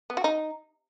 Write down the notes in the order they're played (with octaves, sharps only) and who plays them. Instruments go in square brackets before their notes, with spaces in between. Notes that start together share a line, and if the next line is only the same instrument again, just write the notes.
[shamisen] B3
F#4
D#4